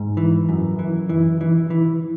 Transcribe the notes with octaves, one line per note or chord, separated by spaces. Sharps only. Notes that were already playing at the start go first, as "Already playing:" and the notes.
Already playing: G#2
E3
F#2
E3
E3
E3
E3